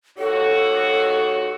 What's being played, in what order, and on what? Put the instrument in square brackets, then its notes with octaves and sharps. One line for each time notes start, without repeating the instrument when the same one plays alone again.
[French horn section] D#2 F#4 C#5 [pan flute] A4